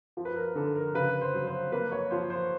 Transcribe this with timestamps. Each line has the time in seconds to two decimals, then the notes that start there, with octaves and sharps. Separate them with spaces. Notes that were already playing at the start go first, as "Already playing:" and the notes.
0.17 F3
0.25 B4
0.36 A#4
0.55 D3 A4
0.76 A#4
0.94 C#3 B4
1.21 C5
1.34 F#3
1.47 C5
1.72 A#3 B4
1.92 C#5
2.11 F3 C5
2.30 C5